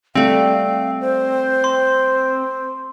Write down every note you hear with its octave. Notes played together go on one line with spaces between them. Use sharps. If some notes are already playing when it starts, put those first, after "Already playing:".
G3 A3 C4 F5
C5
C6